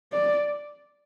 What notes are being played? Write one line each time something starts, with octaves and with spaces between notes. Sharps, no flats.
D5